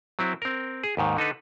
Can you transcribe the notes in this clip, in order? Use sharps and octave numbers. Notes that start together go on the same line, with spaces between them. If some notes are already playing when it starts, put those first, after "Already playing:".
F#3 C4 E4
C4 A#4
G#4
D#2 G#2 D#3
D3 D#4 A4 B4